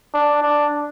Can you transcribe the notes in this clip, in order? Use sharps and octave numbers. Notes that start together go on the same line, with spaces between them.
D4
D4